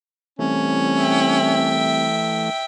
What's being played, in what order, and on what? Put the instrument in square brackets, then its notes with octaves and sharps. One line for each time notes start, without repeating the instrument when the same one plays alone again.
[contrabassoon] C2 [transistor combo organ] E3 A3 [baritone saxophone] C#4
[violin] E5 G5